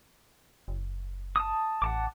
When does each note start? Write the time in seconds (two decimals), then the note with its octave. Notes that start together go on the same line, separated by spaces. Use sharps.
0.68 F#1
1.36 A5 D#6
1.82 A1 F#5 A5 D6